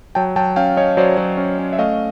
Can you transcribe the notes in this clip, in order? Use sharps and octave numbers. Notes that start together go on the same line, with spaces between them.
F#3 G5 A5
F#3 G5 A5
C#4 F5 G5
C#4 C#5 D#5
F#3 C5 D5
F#3
C#4
C#4
E5
A3 D#5 F5